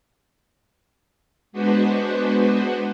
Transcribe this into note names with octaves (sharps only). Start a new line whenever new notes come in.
G#3 B3 D4 F#4 B4 C5